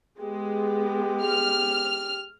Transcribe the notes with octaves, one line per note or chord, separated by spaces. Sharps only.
G#3 B3 G4
F6